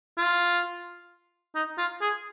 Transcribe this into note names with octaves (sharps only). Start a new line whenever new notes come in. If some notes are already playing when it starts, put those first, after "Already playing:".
F4
D#4
F4
G#4